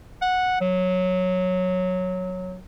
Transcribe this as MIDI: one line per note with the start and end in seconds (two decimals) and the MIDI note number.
0.22 0.57 78
0.61 2.59 54